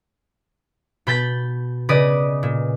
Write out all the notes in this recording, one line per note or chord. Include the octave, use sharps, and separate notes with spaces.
B2 B5 G6 A6 B6
C#3 B4 D5 D#5 D#6
A#2